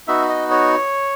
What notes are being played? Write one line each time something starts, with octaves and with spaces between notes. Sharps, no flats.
B3 D#4 F#4 E5
D#5
C#5